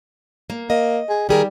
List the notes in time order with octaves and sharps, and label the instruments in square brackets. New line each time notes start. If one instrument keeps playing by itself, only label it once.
[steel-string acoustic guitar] A#3
[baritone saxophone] A#3 [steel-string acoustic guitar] D#5
[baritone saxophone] G#4
[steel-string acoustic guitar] D#3 G#4 A#4 [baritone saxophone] G3